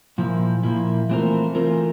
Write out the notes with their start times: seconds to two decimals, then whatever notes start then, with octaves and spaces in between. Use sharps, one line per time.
0.18 A#2 F3 A#3 E4
0.63 A#2 F3 A#3 E4
1.09 E3 A3 C4 F4 A#4
1.55 E3 A3 C4 F4 A#4